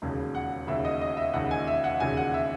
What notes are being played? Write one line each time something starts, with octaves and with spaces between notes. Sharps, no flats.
E1 D#2 C#3
F#5
E1 D#2 C#3 E5
D#5
D#5
E5
E1 D#2 C#3 F#5
G#5
E5
F#5
E1 D#2 C#3 G#5
F#5
E5